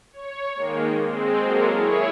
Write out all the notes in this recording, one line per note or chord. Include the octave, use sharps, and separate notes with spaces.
C#5
D#3 G#3 A#3
G#3 C4
F#3 G#3 A#3 A4 A#4
E4 G#4 C#5